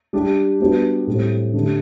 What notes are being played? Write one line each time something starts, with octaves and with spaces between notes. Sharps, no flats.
G3 D4 G4
G3 B3 D4 F#4
A2 G3 C4
D3 A3 D4 G4